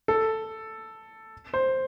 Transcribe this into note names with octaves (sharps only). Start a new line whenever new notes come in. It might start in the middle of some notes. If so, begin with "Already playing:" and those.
A4
C5